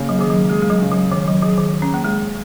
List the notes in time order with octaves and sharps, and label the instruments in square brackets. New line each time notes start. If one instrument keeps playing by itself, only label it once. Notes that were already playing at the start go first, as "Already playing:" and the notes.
Already playing: [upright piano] C#3 A#3
[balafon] F#3
[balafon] D#3 [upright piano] G#4
[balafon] F#3
[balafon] G#3 [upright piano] G#4
[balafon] G#3
F#3
[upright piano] C#3
[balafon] F#3
[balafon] D#3 [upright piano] C#4
[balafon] F#3
[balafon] F#3 [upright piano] G#4
[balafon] D#3
[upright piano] G#4
[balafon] C#4
A#3
[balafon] G#3 [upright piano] G#4